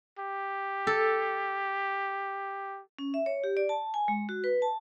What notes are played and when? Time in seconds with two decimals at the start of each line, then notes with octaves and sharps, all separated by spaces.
0.19 G4
0.87 A4
2.99 C#4
3.14 E5
3.26 C#5
3.44 G4
3.57 D5
3.69 A5
3.94 G#5
4.08 G#3
4.29 F#4
4.44 B4
4.62 A5